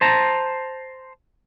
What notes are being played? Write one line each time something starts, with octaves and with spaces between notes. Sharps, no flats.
C5 A5 A#5